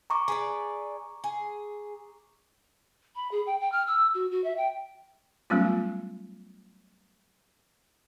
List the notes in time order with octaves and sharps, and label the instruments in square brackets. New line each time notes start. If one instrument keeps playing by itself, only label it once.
[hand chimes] A#5 C#6 D6
[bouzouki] G#4 B4 D5
G#4
[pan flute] B5
G#4
G5
G5
F6
E6
F#4
F#4
E5
G5
[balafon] F#3 G3 A3 B3 C#4 F4